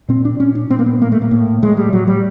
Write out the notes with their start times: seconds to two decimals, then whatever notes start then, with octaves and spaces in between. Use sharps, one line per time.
0.09 A#2 C4
0.25 D4
0.39 A#2 C#4
0.55 D4
0.70 A#2 C4
0.79 A#3
0.86 B3
1.01 A2 A#3
1.12 A3
1.22 A#3
1.31 A2
1.62 A2 G#3
1.77 G3
1.92 A2 F#3
2.08 G3